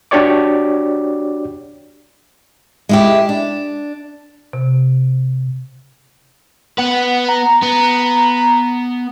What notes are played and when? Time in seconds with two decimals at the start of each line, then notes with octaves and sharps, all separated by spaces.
0.11 D4 F#4 G4 C#5 D5 D6
2.89 G#3 E4 G4
3.29 D4
4.53 C3
6.78 B3 B4 F#5
7.29 A#5
7.62 B3